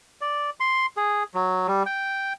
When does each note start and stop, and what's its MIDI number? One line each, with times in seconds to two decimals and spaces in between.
0.21 0.50 74
0.60 0.86 84
0.97 1.23 68
1.34 1.67 54
1.68 1.83 55
1.86 2.33 79